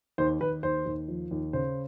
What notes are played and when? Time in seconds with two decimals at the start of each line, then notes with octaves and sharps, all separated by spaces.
0.18 D#2 C5
0.41 D#2 B4
0.63 D#2 C5
0.86 D#2
1.08 F3
1.31 D#2
1.53 C#3 C5